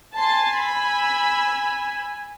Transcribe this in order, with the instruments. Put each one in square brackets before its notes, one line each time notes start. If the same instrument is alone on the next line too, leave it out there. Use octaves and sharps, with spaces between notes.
[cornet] G#5 [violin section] A5 C6 A6
[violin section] B5 E6